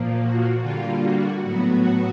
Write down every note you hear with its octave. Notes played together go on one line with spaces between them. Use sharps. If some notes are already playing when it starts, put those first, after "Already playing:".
Already playing: A#2 F3 A#3
F#4
D3 G3 A#3 F4
F#4
A2 F#3 B3 F#4